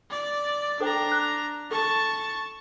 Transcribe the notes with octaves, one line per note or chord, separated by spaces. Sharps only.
D5
D4 A4 C5 G5 A#5
F#6
A4 A5 C#6